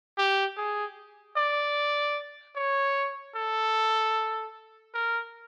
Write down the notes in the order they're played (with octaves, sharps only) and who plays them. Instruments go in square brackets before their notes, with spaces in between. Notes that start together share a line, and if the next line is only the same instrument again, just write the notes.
[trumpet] G4
G#4
D5
C#5
A4
A#4